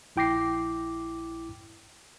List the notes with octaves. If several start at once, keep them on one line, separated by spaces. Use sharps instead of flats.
A#1 E4 G5 D6 A#6 C7